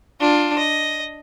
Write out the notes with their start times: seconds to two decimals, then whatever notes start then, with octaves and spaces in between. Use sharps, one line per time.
0.20 D4 F4
0.58 D#5